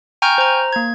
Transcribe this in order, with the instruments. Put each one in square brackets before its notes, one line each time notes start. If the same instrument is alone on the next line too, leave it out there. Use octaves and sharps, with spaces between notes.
[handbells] G5 G#5 A#5 C#6 F6 G6
C5 A#5
A#3 G#6